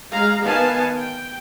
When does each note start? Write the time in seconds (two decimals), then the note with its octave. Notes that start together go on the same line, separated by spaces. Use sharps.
0.11 G#3 G#4 F5 A#5
0.43 D#3 B3 F5 G#5 A5
0.97 G5